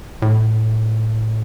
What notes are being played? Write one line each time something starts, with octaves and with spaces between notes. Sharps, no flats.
A2